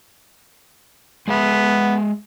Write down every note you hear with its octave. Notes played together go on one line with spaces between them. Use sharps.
G#3 B3 G#4 E5